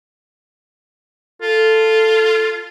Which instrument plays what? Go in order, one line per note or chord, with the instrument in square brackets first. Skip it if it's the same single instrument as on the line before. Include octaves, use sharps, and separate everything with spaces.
[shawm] F4 [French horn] A4